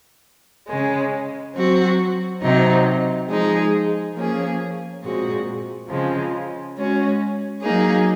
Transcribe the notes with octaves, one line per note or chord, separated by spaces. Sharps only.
C#3 G#3 C#4
F#3 C4 F#4
C3 F#3 C4 D#4
F3 G#3 D#4 G#4
F3 A#3 C#4 G#4
A#2 G#3 C4 F#4
C#3 F3 G#3 C4
G#3 C#4 F#4
F#3 A#3 D#4 G#4